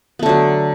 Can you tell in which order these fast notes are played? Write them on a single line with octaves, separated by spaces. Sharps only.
B3 A3 D3 F#3